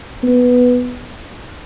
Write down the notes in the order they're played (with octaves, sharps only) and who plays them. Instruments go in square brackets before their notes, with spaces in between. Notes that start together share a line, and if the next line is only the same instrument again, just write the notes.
[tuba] B3